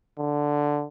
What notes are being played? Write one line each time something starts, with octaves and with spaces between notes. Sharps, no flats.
D3